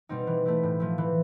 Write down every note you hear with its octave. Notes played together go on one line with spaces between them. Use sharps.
B2 G3 C4 D#4
E3
A3 C4 E4
A2
F3 A3
E3